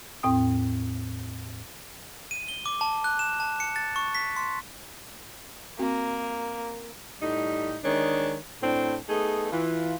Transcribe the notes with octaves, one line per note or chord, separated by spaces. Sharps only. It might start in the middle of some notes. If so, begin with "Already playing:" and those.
E2 A2 C4 G5 D#6
D#7
G7
D6
A5
F#6
E7
A5
C#7
A6
C#6
B6
C6
A#3 C4 F#4
A2 G3 D#4
D#3 G#3 D4 C#5
A2 C4 D4
A3 B3 D#4 G#4
E3 F4